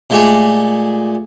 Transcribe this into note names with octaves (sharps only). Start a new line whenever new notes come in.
A#2 G#3 A3 G4 G#4